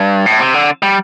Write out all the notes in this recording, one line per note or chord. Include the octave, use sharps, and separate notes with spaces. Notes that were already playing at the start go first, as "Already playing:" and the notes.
Already playing: G2
A2
C3
D3
G3